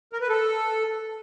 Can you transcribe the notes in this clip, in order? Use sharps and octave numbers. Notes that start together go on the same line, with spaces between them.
A#4
B4
A4